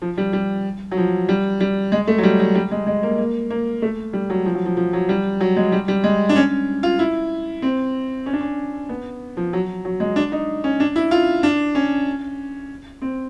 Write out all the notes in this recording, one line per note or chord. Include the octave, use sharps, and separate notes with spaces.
F3
G3
G3
F#3
F3
G3
G3
G#3
A3
F#3
G3
F#3
G3
G#3
G#3
A#3
A#3
A#3
A3
G3
F#3
F3
F#3
F3
F3
F#3
G3
F#3
G#3
G3
G3
G#3
D4
C#4
F4
E4
C4
C#4
D4
C#4
B3
F3
F#3
F#3
G#3
D4
D#4
C#4
D4
E4
F4
D4
C#4
C4